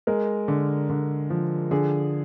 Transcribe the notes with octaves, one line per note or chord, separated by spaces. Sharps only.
G#3 A#4
D3
D3
F3
D3 G#4